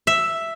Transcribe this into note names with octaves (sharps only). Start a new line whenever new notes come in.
E5